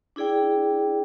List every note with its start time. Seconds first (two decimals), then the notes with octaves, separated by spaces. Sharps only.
0.16 D4 E4 G#4 D5 G5